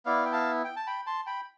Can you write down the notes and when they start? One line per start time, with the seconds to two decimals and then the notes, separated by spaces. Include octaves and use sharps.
0.06 B3 E4 D5 F5
0.25 G5
0.32 F5 A5
0.64 G5
0.76 A5
0.87 G5 B5
1.06 A5 C6
1.27 G5 B5